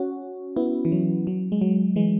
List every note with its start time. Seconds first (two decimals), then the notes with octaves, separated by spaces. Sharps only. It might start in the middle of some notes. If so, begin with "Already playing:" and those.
Already playing: C#4 F#4
0.56 B3 E4
0.85 E3
0.92 F#3
1.27 F#3
1.52 G#3
1.61 F#3
1.96 E3 G#3